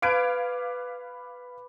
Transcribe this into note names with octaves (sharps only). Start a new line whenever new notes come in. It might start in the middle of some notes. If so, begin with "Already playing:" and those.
B4 F5 D6 G#6 D7